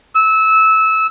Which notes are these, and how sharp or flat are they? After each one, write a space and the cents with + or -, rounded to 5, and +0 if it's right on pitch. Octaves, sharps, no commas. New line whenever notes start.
E6 -20